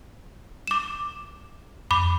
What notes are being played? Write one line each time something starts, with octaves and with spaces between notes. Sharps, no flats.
D6 E7
F2 B5 D6